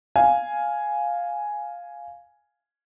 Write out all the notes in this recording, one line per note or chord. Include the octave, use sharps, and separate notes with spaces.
F5 G#5